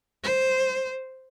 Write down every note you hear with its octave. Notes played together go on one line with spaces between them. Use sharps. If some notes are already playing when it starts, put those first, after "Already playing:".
C5